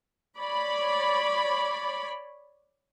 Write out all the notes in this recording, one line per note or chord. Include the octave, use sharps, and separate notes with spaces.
C#5 D5 B5